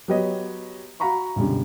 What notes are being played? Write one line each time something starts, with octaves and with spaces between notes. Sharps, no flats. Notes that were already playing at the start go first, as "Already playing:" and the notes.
F#3 B3 G4 B4 C#5 D#5
F#4 F5 F#5 A#5 B5 C#6
C#2 F#2 B2 D3 G3